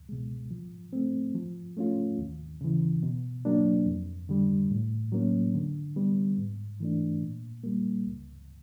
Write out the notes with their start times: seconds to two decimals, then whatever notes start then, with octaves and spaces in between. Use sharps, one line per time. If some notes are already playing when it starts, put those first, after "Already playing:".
Already playing: C#2
0.09 B2 G#3
0.51 F3
0.93 A3 C4
1.35 F3
1.77 A3 C#4 F4
2.19 D#2
2.61 C#3 E3
3.03 B2
3.45 F#3 A#3 D4
3.86 F2
4.29 D3 G3
4.71 A2
5.12 F#3 A#3 C#4
5.55 D3
5.96 G3 B3
6.38 G#2
6.80 E3 A3 D4
7.22 A#2
7.64 G3 A#3
8.06 C#2